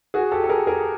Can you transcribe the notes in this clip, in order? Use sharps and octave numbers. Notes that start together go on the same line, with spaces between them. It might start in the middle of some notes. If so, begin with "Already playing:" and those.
F#4 G#4
G4 A4
A4
G#4 A#4
G#4 A#4